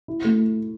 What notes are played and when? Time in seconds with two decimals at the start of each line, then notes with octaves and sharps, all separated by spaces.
0.08 E4
0.25 A3